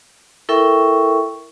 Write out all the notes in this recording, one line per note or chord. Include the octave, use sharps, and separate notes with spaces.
E4 A4 A#4 E5 G5 C#6